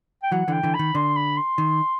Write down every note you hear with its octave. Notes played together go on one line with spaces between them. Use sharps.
G5
E3 F#3 F#5
D3 E3 G5
D3 E3
B5
D#3
D3 C6
B5
C6
D#3